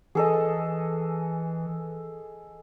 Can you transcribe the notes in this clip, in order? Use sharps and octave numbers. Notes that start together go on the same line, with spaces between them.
E3 G#4 A4 D#5